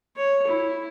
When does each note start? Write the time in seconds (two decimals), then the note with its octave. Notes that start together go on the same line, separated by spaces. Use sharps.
0.17 C#5
0.47 E4